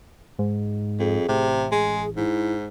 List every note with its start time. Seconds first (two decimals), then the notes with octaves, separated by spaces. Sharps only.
0.39 G#2
1.00 F2 G#4
1.29 A1 C3
1.72 G#3 G#4
2.17 G#2 E4